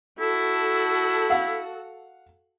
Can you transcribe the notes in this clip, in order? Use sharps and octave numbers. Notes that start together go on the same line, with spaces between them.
E4 F#4 A4
F5 F#5